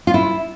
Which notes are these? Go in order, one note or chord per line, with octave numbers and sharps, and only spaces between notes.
F4
E4